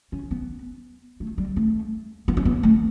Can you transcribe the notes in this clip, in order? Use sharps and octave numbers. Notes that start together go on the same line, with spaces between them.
C#4
B3
A3
G3
A3
B3
C#4
B3
A3